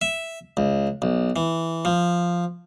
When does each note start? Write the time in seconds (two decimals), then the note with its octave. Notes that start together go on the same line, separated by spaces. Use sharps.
0.01 E5
0.57 C#2
1.02 B1
1.36 E3
1.85 F3